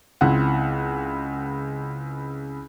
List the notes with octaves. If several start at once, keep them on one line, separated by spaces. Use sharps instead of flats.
C#2 C4 E4 F#5